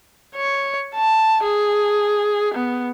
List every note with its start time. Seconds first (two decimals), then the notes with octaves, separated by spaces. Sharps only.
0.36 C#5
0.95 A5
1.43 G#4
2.54 B3